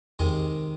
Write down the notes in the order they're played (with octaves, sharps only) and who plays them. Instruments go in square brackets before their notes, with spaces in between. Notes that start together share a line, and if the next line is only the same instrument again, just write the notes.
[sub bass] E2 [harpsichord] C3 D#3 G#3